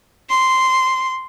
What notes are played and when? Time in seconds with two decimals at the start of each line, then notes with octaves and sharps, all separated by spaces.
0.30 C6